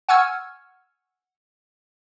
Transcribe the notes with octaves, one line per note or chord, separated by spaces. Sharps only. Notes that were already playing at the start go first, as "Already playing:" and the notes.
F#5 G#5 C#6 E6 F6 G#6